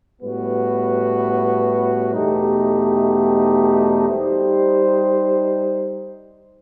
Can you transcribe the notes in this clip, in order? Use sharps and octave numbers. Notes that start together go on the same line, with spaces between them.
A2 G3 B3 F#4 B4
E2 B2 A3 D#4 G4
G3 D#4 G4 C5